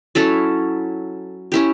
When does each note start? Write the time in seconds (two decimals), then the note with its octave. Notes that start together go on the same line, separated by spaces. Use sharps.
0.15 F#3 C#4 E4 A4
1.52 C#4 E4 G4